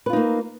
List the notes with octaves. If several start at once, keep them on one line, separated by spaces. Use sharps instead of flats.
A#3 D#4 F4 B4